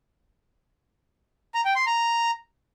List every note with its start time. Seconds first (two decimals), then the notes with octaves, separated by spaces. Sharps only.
1.54 A#5
1.65 G5
1.76 C6
1.87 A#5